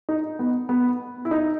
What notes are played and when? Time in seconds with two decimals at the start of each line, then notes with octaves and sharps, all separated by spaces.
0.09 D#4
0.39 B3
0.69 B3
1.25 E4
1.31 D#4